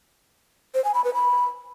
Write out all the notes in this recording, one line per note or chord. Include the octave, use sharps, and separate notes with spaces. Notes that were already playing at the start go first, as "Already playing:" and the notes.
C5
G#5
B5
B4
B5